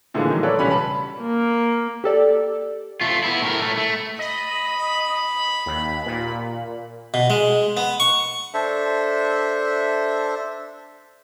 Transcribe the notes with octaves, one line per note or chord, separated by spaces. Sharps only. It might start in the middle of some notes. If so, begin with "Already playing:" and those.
A2 D3 E3 F3 G#3 A#3
A2 D#3 F#3 A#3
A4 B4 C#5 D5
E1 C#2 G3 C#4 B5
A5 B5
A#3
G4 A4 D5
A3 F4
B3 E4
A2 A#4
A2 A3
A3
D#5 B5
D#2
A#2
B2
G#3
B3
C#6
D4 A4 C5 E5